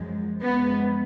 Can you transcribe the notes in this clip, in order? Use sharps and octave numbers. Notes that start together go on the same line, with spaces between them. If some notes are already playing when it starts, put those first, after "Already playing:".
Already playing: F#2 F3 G#3
F#2 F3 G#3 B3